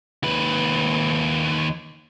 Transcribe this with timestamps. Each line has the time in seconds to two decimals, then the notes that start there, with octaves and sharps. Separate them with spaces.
0.23 D#2 B4